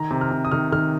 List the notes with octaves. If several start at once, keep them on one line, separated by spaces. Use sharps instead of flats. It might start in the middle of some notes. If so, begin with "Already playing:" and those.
Already playing: D#3 A#5
C3
F6
C3
D#6
D#3 F6
D#3 F6